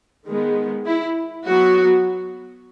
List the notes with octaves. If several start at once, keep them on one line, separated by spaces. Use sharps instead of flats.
D#3 G#3 B3
E4
F#3 B3 F#4